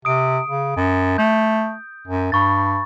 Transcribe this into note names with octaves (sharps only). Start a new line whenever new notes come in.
C3 D#6 D7
C#3
F#2
A3 G6
F#2
G2 B5 C#6 A6